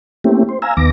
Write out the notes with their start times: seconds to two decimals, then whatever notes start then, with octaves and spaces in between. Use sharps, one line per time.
0.24 A3 A#3 C4 C#4 E4 G4
0.49 C5
0.62 F5 G#5 A#5 E6
0.77 D#2 D#3 B3 D6 A#6